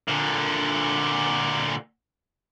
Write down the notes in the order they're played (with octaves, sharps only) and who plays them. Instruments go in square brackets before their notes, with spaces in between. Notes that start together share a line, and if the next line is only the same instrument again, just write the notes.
[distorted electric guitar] A#2 D3